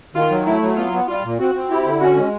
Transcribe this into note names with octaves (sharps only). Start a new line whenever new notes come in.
D#3 F4
F#3
A3 E4
F#3
B3 F4
B3
G3 F4
A#2
C4 F#4
C4
E4 G4
D3
C#4 F#4
G#3